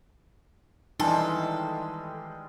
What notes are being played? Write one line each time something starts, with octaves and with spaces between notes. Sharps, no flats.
D#3 E3 G3 G#3 D4 D#4 A4